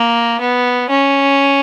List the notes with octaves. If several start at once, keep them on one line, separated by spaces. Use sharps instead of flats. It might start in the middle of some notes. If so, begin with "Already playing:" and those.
Already playing: A#3
B3
C#4